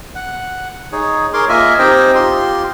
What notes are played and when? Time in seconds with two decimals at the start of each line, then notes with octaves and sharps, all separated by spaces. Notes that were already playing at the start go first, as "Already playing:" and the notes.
0.15 F#5
0.92 D#4 G#4 C#5
1.33 G#4 A#4 C#5 C6 D6
1.49 A#3 F4 A#4 D#5 E5 G#5
1.79 C4 D#4 G4 C5 D#5 G5
2.15 F4 G4 C6